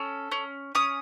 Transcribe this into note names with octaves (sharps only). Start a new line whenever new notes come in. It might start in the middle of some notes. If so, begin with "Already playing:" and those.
Already playing: C#4 A4
C#4
C#4 D#6